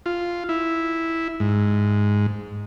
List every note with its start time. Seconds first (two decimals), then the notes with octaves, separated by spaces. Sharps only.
0.06 F4
0.49 E4
1.40 G#2